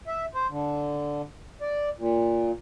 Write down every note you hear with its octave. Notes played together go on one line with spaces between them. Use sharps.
E5
C5
D3
D5
A#2